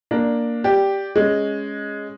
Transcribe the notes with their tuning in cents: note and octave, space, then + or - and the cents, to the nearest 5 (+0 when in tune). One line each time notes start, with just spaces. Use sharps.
A#3 +0 D4 +0
G4 +0 D5 +0
G#3 +0 C#4 +0